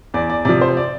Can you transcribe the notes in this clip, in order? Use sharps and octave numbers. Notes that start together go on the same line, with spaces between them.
E2 D5
D5
C3 F3 D5
C5
D5